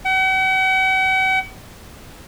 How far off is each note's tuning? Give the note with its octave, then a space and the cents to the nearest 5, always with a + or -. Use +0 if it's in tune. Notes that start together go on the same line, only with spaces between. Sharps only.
F#5 +45